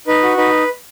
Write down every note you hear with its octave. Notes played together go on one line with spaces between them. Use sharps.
D#4 B4
F#4
D#4 B4